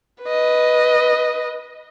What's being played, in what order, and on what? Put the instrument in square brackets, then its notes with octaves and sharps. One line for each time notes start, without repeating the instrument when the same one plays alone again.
[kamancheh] B4 D#5